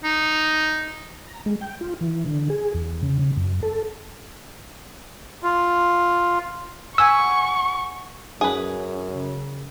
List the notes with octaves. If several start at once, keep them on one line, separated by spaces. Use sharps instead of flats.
D#4
A#5
G#3
G5
F4
E3
D3
G#4
E2
C#3
C#3
F#2
A4
F4
F#5 G#5 B5 C#6 E6
F#2 C#4 G#4 B4
C#3